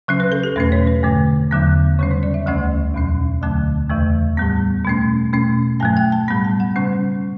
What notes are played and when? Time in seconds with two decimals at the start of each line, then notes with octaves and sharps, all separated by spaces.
0.08 C#3 F#3 C#4
0.20 B4
0.32 A4
0.43 G4
0.56 E2 B2 A3 C#4 B4
0.72 C#5
0.87 B4
1.03 G2 D3 A3
1.51 E2 D3 F#3 B3
1.99 C#3 G3 C#4 C#5
2.11 C#5
2.23 D5
2.34 E5
2.46 D2 C#3 E3 A3 C#4 F#5
2.95 E2 B2 F#3 C#4
3.42 D2 D3 F#3 A3 A5
3.90 E2 C#3 E3 A3
4.37 A2 G3 B3
4.85 B2 A3 C#4
5.33 B2 A3 C#4
5.80 G2 F#3 A3 A5
5.97 G5
6.12 A5
6.28 A2 G3 B3 B5
6.44 A5
6.60 F#5
6.76 C#3 G3 C#4